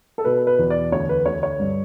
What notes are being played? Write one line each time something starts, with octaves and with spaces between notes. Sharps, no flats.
A4
B2 B4
B4
E2
D5
D2 C#5
B4
D2 C#5
C#5
G2